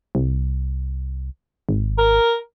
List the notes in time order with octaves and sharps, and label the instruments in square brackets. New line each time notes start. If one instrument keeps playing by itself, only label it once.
[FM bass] C2
G#1
[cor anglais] A#4